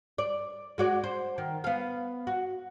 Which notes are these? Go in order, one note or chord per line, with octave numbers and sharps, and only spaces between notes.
D5
G#3 F#4 D5
C5
D#3
B3 F5
F#4